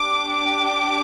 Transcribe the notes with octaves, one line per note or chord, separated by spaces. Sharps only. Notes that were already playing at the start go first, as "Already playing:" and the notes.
Already playing: D4 G4 D6
D6